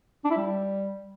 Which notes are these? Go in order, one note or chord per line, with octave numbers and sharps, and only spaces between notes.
D4
E4
G3